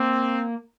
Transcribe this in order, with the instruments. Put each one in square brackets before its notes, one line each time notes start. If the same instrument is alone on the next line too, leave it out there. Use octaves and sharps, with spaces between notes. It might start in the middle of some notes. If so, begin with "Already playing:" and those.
Already playing: [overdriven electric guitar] A#3 [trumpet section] C4